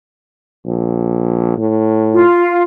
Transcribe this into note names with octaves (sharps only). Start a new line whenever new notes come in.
A#1
A2
F4